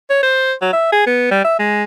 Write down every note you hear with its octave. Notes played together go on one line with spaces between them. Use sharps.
C#5
C5
F#3
E5
G#4
B3
G3
E5
G#3